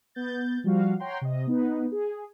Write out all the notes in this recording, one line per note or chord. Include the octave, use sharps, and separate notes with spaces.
B3 G6 A6
F3 G3 F#4 F5
C#5 F#5 G5 A#5 C6
C3 D#5
B3 D#4 B4
G#4